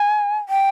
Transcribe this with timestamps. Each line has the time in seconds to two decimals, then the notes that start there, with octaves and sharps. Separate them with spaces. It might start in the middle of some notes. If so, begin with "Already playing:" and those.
Already playing: G#5
0.49 G5